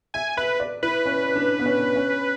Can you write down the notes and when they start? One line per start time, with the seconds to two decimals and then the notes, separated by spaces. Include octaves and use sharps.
0.14 E5 G#5
0.37 B4 E5
0.60 D5
0.83 E4 B4
1.06 C#4
1.36 D4
1.60 B3
1.66 C#4
1.96 C#4